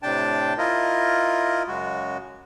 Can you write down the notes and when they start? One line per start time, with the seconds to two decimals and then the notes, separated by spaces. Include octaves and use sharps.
0.03 A2 C3 D4 G5 A5
0.58 E4 F4 A#4 D#5
1.67 F#2 C#3 G#3 F#4